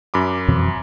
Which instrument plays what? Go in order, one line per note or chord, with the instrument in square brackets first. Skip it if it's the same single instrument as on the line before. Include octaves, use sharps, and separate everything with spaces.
[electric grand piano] F#2 B5 D6
[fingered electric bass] F2 B2 E3